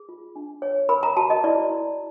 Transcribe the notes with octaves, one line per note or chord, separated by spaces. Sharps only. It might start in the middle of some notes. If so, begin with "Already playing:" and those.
Already playing: G#4
F4
D4
C#5
A#4 B5
A#5
F#4 A5
D#5
E4 D5
E4